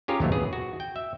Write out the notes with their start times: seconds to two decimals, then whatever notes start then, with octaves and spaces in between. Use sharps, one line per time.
0.08 C#4 F4 G4 G#4 A#4 C#5
0.20 D#2 C3 F#3 A3 B3 C#5
0.32 G#4 B4
0.53 F#4
0.80 G5
0.96 E5